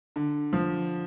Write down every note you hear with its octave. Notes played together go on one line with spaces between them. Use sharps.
D3
F3